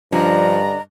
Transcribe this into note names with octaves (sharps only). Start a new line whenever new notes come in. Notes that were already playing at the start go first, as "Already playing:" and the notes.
G2 D3 F3 C#4 D4 D5 D#5 A#5